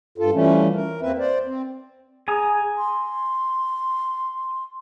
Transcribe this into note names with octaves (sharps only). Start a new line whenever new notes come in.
G2 F4 A4
E3 F3 G3 A3 C#4
A#4
E2 A#3 C4 B4 E5
C5 D5
C4
G#4 G#5 A#5 D#6
C6